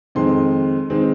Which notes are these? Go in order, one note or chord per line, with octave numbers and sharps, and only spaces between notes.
F2 D#3 G#3 C4 C6
D#3 G#3 C4